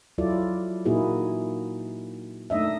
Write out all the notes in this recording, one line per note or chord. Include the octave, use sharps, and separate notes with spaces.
F#3 E4 F4 A4 D5
A#2 A#3 D#4 E4 F#4 G#4
A3 D4 D#4 D#5 E5